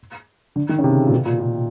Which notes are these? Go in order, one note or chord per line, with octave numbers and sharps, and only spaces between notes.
D3
D#3
C#3
C3
A#2
B2
A#2
A#2